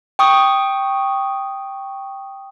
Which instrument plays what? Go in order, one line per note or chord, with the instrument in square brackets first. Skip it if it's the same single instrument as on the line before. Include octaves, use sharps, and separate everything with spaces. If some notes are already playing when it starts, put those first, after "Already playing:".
[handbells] G5 C#6 D#6